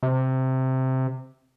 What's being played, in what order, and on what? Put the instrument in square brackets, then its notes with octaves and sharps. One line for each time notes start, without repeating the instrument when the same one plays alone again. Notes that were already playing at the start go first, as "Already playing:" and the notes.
[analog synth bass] C3